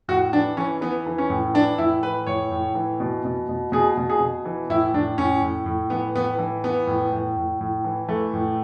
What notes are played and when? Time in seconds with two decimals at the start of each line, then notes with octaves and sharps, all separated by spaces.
0.08 A2 F#4
0.33 E3 D4
0.57 E3 C#4
0.81 E3 B3
1.07 E3
1.18 C#4
1.30 A2
1.54 E3 D4
1.78 A2 E4
2.03 E3 B4
2.27 A2 C#5
2.51 A2
2.75 E3
3.00 B2
3.25 B2
3.49 B2
3.72 B2 G#4
3.97 B2
4.10 G#4
4.21 B2
4.45 E3
4.69 A2 E4
4.94 A2 D4
5.18 A2 C#4
5.42 A2
5.66 A2
5.90 E3 B3
6.15 A2 B3
6.39 E3
6.64 E3 B3
6.87 A2
7.12 A2
7.37 A2
7.61 A2
7.84 E3
8.08 E3 A3
8.34 A2